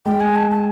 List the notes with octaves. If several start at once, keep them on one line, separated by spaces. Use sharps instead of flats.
G#3 G5
G#5
A5
A5